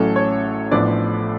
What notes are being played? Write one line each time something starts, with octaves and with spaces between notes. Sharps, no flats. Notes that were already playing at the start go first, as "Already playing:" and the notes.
Already playing: A1 A2 F#3 C#4 A4
C#5
A1 A2 F3 B3 D4 D5